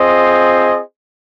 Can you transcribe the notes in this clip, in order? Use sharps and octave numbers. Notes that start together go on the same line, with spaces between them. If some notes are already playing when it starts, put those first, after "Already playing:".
Already playing: C4 F4 G#4 C5 D#5